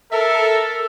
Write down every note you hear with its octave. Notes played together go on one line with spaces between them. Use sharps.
A4 A#4 E5